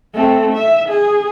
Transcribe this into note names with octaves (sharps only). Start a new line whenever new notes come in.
A3 C4
E5
G#4